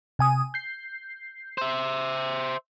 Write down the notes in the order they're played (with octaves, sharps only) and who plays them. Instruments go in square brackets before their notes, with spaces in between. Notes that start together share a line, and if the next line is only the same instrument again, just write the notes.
[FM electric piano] C3 G#5 D#6
G6 C7
[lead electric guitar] C5 E5